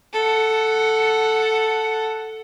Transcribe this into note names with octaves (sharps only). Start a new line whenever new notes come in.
A4 F#5